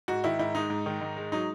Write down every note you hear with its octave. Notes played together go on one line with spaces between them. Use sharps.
G#2 F#4
D#3 E4
G#2 E4
G#3 D#4
G#2
D#3
G#2
G#3
F#3 D#4